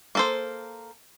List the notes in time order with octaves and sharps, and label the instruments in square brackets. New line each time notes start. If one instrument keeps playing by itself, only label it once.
[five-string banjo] A#3 A4 C5